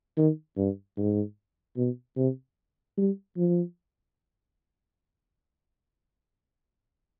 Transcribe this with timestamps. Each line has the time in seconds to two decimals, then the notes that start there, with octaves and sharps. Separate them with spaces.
0.18 D#3
0.57 G2
0.97 G#2
1.77 B2
2.17 C3
2.98 G3
3.37 F3